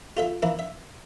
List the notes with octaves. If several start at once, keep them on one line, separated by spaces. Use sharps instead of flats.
F4 A4 E5
E3 A#3 E4
E5